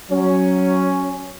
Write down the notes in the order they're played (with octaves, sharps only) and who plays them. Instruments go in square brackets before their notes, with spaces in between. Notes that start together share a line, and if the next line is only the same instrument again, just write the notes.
[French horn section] F#3 [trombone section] C#4